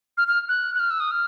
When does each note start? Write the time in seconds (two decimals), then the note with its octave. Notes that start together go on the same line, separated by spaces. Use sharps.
0.17 F6
0.28 F6
0.49 F#6
0.75 F#6
0.79 F6
0.90 E6
1.00 D#6
1.11 F6